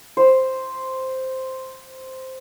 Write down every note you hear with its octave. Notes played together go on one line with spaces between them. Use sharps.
C5 B5